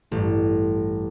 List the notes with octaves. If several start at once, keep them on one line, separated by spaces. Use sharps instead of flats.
A1 G2